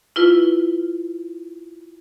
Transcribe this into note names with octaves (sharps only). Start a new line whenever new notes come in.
E4 F4 B4